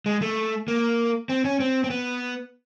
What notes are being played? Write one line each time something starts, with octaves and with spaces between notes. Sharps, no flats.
G#3
A3
A#3
C4
C#4
C4
C4
B3